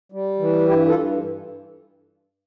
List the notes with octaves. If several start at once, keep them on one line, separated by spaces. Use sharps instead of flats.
G3
E3
G2 E4 G4
F4 A4
G2